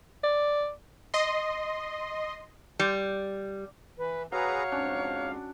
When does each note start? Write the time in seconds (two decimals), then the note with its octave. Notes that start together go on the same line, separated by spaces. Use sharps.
0.24 D5
1.14 D#5 C6
2.79 G3
3.98 E3 B4
4.32 F#3 G#4 B4 C#5 F5 A#5
4.72 F2 G#2 C#4 D4